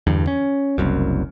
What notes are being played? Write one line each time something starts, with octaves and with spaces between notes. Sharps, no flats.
E2 G2 D3
C#4
F#1 C2 F#2